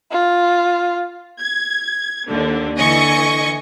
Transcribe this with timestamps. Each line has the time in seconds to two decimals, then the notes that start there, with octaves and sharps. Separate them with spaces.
0.11 F4
1.40 G#6
2.28 D#2 D3
2.78 D3 E3 D#5 G#5 C#6 G#6